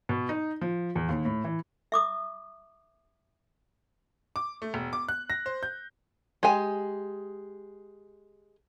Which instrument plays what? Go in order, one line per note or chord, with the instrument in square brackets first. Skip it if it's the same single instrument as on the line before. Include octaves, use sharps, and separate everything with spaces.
[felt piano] B2
D#4
F3
E2
D#2
A2
E3
[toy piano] E5 D6 D#6
[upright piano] D6
A3
E1
D6
F#6
A#6
C5
G6
[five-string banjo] G#3 G4 G#5